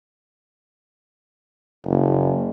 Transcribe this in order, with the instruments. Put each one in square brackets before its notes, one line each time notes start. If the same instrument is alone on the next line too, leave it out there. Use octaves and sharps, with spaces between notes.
[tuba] F#1